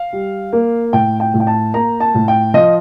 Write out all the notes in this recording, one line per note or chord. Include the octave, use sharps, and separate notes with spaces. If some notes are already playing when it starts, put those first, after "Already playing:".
Already playing: F5
G3
A#3
A2 G5
G5
A2
G5
A5
A#3 A#5
A5
A2
G5
F3 D#5